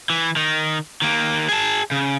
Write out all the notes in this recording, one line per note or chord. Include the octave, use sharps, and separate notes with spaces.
E3
D#3
D#3 A#3
G#4 A5
C#3